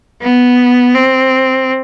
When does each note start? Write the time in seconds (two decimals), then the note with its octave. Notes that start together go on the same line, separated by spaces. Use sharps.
0.22 B3
0.95 C4